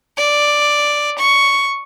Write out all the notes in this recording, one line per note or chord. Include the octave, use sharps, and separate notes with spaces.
D5
C#6